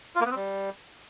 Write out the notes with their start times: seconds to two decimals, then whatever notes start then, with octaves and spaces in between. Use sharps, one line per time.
0.16 F4
0.21 A#3
0.26 B3
0.31 C4
0.36 G3